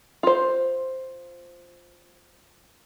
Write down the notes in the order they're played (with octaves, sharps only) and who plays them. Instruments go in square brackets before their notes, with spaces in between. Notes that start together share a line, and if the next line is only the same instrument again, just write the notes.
[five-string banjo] F4 C5